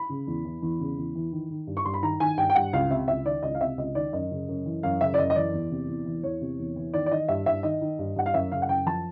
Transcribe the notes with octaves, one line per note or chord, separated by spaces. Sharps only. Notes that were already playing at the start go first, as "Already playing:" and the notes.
Already playing: B5
C#3
E2
E3
E2
C#3
E2
E3
D#3
D#3
G2
C#6
G2 C6
B5
D#3 A#5
D#3 G#5
G2 G5
G5
G2 F#5
C#2 F5
C3 E5
C#2 E5
D#3 D5
C#2 D#5
F5
C3 E5
C#2 D#5
D#3 D5
F#2 D#5
C#3
F#2
E3
F#2 F5
C#3 E5
D5
F#2 D#5
D#5
E3 D5
E2
C3
E2
E3
E2 C#5
C3
E2
E3
D#3 D5
D5
D#3 D#5
G2 E5
G2 E5
D#3 D#5
D#3
G2
G2 F#5
F5
F#2 E5
C#3 F5
F#5
F#2 G5
F3 A5